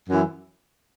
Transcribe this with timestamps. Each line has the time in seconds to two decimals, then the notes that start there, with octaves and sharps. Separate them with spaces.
0.09 F#2 E3